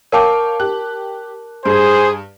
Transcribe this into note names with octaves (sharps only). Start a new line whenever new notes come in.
A#4 C#5 F5 G5 A5 D6
G4 F#6
G2 G#4 C5